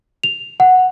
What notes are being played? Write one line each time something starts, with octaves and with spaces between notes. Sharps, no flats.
F7
F#5